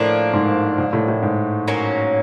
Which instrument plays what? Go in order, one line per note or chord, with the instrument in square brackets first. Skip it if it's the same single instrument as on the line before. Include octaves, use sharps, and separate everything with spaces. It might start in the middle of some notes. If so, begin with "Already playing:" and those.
Already playing: [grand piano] A2 [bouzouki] F3 A#3 D4
[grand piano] G#2
G#2
A2
A2
G#2
[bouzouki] F#3 A#3 C#4